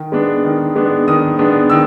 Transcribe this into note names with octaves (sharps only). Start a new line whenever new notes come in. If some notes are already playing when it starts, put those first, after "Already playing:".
Already playing: D#3
G#3 B3 D4
D#3
G#3 B3 D4
D#3 D#6
G#3 B3 D4
D#3 E6